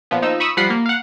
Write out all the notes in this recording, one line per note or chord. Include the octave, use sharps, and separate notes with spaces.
A#2 F3 B3
F3 D#4 E6
B5 C#6 D#6 E6
F3 G3 F4 F#5 B5 C7
A#3
F5 F#5